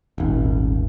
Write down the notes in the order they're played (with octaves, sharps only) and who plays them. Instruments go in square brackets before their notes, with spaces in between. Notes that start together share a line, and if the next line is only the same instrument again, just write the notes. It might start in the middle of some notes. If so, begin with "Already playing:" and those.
[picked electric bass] D#1 G#1